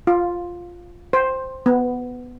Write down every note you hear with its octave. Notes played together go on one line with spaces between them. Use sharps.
F4
C5
B3